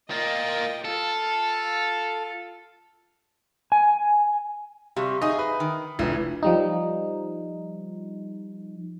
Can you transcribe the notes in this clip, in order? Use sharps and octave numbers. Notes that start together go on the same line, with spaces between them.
A#3 F4 D#5 G5
F4 A4 F5
G#5
C3 G3 F5 C#6
D#4 G#4 D#5 E5 D#6
B4
D#3
F1 D4 E4 F4 B4
F3 G3 D#4